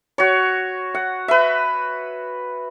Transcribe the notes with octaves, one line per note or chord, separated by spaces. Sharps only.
F#4 C#5
F#5
B4 E5